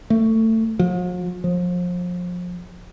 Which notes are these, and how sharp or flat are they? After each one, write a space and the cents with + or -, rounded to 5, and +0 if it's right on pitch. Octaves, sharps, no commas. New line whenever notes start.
A3 +20
F3 +45
F3 +30